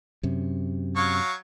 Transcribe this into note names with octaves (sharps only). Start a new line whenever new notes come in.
F#2 C3
F#3 F5 C#6